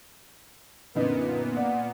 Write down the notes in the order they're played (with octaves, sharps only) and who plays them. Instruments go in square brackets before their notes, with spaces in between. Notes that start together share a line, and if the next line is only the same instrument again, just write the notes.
[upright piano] F#2 D3 D#4 [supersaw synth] A#2 B3 [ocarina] B4
[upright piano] D5 [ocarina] F#5